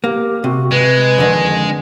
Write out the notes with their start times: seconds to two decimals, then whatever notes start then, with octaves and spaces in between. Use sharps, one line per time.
0.04 A#3 G4
0.44 C3 F#4
0.71 G#3 B4
1.18 F2 D3 D#3